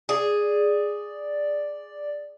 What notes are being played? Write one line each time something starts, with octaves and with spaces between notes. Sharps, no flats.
G#4 D5